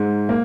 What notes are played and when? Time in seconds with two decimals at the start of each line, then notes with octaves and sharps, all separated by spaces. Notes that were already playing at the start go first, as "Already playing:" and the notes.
Already playing: G#2
0.29 A#3